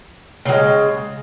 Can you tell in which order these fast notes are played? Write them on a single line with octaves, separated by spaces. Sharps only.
C#3 F#3 G#3